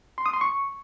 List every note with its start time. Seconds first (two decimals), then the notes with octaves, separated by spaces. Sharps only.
0.18 C6
0.26 D#6
0.33 C6
0.41 C#6